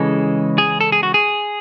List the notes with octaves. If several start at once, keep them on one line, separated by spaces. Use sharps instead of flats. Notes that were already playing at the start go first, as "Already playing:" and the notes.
Already playing: C#3 E3 G#3 A4
G#4
A4
G#4
F#4
G#4